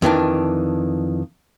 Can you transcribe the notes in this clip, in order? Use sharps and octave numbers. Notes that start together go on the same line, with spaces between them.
F2 D#3 E3 D4